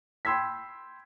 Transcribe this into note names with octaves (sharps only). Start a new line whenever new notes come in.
G5 B5 C6 E6 G#6 B6